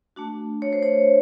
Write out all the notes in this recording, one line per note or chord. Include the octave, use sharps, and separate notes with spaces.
A3 D4 F#4
C#5
C5
C#5